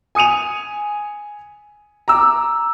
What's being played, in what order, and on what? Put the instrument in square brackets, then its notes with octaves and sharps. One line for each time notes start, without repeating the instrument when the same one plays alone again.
[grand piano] G#5 D#6 C#7 D#7 F7
A#5 D6 E6